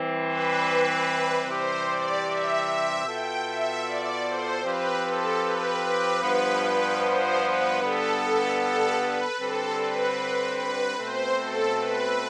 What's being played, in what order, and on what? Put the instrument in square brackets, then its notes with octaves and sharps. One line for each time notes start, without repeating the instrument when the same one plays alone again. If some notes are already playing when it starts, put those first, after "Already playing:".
Already playing: [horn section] E3 G3 C4
[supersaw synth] B4
[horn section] C3 E3 G3 C4 G4 [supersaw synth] C5
[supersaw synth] D5
E5
E5
[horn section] B2 B3 F4 A4 [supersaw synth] G5
[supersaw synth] E5
D5
C5
[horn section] F3 C4 G4 [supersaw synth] B4
[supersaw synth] A4
B4
B4
[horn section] G2 F3 B3 [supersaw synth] B4
[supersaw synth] B4
C5
B4
[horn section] G2 D3 G3 B3 [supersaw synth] A4
[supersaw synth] A4
B4
[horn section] D3 G3 C4 [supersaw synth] A4
[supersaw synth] B4
B4
[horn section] B2 A3 C4 [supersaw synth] C5
[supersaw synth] A4
B4